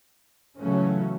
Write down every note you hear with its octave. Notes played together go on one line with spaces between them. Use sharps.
C#3 E3 F#3 A3 C#4